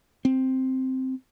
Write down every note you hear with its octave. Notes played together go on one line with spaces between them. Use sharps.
C4